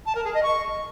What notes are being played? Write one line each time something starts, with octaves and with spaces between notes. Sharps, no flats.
A5
A#4
G#4
D#5
C#6